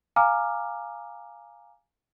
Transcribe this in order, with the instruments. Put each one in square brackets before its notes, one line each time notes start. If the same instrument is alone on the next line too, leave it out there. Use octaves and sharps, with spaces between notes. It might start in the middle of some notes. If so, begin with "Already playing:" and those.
[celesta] F5 G#5 A#5 D6 F6